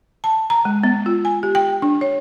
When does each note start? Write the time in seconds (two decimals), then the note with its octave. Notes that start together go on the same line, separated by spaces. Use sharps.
0.24 A5
0.50 A#5
0.65 G#3
0.84 B3
1.06 F4
1.25 G#5
1.43 G4
1.55 G5
1.82 D4
2.01 C#5